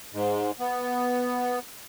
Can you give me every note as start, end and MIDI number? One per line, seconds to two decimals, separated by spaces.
0.13 0.51 44
0.59 1.59 59